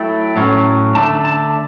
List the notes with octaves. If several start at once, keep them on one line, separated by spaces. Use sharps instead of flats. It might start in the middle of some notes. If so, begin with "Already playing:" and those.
Already playing: F#3 A3 E4 G5
A2 F#3 C#4
D3 A3 D4 A5
A5